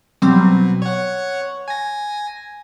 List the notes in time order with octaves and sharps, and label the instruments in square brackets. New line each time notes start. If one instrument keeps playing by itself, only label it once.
[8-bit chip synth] B2 [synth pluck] F#3 G3 C4
[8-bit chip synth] C#5 F#5
G#5 A#6